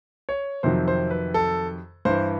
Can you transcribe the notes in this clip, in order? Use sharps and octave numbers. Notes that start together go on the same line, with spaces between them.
C#5
F2 C3 D#3 F#3 C5
C5
B4
A4
G2 E3 C5